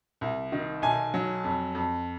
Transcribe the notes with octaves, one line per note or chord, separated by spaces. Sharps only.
C2
D#3
B1 G#5
F#3
F2
F2